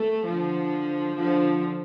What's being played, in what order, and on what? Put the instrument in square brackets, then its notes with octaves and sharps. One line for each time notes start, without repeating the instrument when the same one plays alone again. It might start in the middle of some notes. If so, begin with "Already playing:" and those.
Already playing: [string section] A3
D3 F3
D3 F3